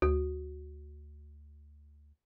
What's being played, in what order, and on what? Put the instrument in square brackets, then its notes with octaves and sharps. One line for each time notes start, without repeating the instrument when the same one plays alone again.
[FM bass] D2 [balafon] F#4